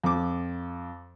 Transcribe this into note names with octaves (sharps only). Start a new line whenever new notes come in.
F2 D6